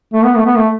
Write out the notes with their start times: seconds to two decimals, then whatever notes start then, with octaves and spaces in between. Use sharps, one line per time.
0.13 A3
0.24 B3
0.36 A3
0.46 B3
0.56 A3